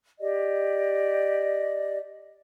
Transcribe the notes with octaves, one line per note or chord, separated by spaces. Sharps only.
G4 D5 D#5